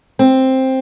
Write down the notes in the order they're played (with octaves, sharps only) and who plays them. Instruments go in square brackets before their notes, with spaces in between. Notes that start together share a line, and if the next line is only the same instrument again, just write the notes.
[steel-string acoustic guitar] C4